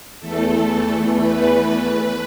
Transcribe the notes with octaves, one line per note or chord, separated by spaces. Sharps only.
E2 E3 A3 A4
B4